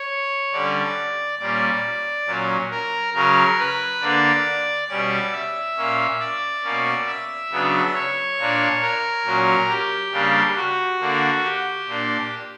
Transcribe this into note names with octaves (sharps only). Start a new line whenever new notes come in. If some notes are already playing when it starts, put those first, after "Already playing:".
Already playing: C#5
D3 G3 C#4 D5
A#2 G3 A#3 C#4 D5
A#2 F#3 C#4
A#4
C#3 F#3 C#4 A#4
B4
D3 A#3 D4 D5
B2 G3 C#4 D5
E5
A#2 A#3 C#4
D5
B2 A#3 C#4
E5
C#3 F#3 B3 D4
C#5
A#2 A#3 D4
A#4
A#2 F#3 C#4
G4
C#3 G3 A#3 D4
F#4
D3 A#3 D4
G4
A#2 A#3 D4